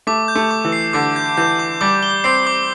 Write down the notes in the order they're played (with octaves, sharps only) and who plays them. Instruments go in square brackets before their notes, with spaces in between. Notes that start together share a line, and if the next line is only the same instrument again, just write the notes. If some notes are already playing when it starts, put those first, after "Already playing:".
[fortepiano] A3 [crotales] D6
[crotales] G6
[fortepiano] A3
[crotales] D6
[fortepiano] E3
[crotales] C7
[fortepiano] D3 [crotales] D6
[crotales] G6
[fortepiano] E3 [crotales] G6
[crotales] D6
[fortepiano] G3 [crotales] D6
[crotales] G7
[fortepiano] C4 [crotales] C7
[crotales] D6